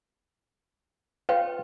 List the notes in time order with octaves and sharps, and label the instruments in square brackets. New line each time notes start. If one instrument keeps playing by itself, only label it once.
[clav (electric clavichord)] F4 [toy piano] B4 C#5 G5